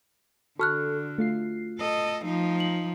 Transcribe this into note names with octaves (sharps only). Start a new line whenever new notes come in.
D3 F#4 A4 C#6 F6 F#6
A3 F4 C7
A4 D#5
F3 D#4
F#7